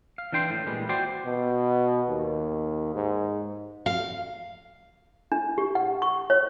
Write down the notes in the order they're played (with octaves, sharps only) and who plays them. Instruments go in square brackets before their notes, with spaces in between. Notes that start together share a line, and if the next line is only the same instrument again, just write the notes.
[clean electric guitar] F5
E3 D4 G5 C6
A2
A#2 E3 G3 G#3
F#4 C5 D5 G5 C6
[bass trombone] B2
D#2
G#2
[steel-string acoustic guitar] F5
[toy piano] D4
G4
F#5
C#6
C#5